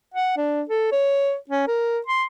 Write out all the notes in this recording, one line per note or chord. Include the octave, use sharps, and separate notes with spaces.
F#5
D4
A4
C#5
C#4
A#4
C6